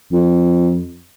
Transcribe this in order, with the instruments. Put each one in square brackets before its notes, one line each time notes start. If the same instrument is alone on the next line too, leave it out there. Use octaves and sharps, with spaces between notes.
[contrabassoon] F2